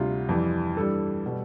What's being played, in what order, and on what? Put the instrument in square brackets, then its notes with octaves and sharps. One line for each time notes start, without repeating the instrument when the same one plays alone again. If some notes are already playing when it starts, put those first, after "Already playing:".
Already playing: [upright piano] D2 C3 G3 F4
F2 E3 G3
G2 E3 G3 A4
B2 G3